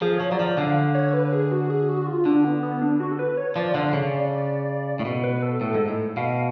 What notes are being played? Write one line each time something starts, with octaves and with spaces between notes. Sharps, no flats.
F3 G#4
F3 C#5
F#3 D5
F3
D3 F5
C#5
B4
G#4
F#4
G#4
F#4
F4
D3 D4
B3
B3
D4
F#4
A4
B4
C#5
F3 D5
D3 F5
C#3 D5
A2
B2
B4
A4
A2 A4
G#2
A2
B2 F5